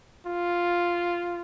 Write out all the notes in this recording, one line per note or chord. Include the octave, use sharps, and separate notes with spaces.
F4